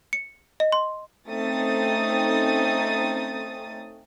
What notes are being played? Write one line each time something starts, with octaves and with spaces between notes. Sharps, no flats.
C#7
D#5
C6
A3 C4 C#4 D#4 D#6 A6